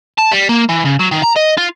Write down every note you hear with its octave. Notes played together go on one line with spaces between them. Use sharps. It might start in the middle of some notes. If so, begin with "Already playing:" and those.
A5
G3
A#3
E3
C#3
F#3
D#3
A#5
D#5
F4